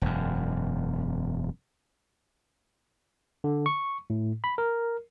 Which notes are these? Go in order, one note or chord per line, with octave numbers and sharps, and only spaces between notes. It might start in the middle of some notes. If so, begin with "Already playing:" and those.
E1 F#2
D3
C#6
A2
B5
A#4